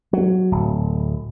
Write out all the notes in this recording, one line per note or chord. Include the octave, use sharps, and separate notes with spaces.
F#3
D1